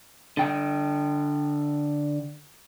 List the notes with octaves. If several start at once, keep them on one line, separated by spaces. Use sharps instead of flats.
D3 G5